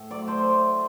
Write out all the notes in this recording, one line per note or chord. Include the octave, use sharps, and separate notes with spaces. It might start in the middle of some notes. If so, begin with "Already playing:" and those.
Already playing: A2
F#3 D5
A3 C5